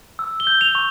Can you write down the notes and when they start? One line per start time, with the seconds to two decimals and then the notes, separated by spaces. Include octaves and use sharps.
0.19 E6
0.40 G7
0.47 G6
0.61 F7
0.75 C#6